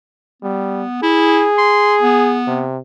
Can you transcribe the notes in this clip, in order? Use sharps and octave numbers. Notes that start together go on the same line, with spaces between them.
G3 B3
E4 G#4
C6
B3
C3